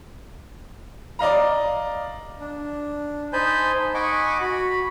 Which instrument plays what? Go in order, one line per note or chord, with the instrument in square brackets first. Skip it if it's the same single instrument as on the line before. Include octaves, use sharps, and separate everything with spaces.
[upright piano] D5 D#5 F5 A#5
[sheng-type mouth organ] D4
D#4 C5 G#5 A5 B5 G6
D#5 F#5 G#5 B5 C#6 D6
F#4 B5